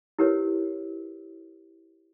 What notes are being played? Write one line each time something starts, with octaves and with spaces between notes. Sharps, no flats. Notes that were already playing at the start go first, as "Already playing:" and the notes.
E4 G4 A#4 B4 C#5